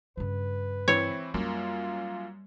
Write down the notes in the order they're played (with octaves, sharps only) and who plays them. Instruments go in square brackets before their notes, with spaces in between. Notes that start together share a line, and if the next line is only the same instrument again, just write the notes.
[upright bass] G2 C#3 [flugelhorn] B4
[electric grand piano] E3 C4 E4 [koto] C#5
[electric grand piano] F#2 A#3 [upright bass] G3 [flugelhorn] F4